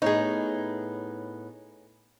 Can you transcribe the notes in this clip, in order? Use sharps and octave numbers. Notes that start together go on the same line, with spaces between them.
A2 B3 D#4 G#4 C#5